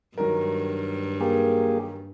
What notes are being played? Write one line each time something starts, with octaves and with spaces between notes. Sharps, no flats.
G2 D#3 F#3 A#4
A#3 G4 G#4